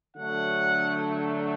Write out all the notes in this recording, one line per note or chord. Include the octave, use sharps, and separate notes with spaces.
D3 F#3 A3 F#5